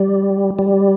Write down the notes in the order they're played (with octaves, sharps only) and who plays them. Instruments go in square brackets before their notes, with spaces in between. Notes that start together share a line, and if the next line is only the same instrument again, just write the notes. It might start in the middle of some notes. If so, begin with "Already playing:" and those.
Already playing: [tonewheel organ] G3
G3